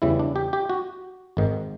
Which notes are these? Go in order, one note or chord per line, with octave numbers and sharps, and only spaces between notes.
E2 C#3 E3 G3 E4
D4
G4
G4
F#4
G#1 G#2 D#3